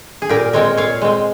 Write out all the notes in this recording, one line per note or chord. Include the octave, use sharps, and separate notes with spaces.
G#4
A#2 G4 A#4
G#3 C4 A#4 C#5
A#2 C#5 F5
G#3 C4